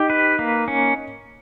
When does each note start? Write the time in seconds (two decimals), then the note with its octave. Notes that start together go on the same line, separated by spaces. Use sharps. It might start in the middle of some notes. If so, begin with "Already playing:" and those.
Already playing: D#4 G4
0.10 B4
0.39 A#3
0.68 C#4